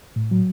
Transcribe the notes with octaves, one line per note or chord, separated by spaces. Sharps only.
A2
F#3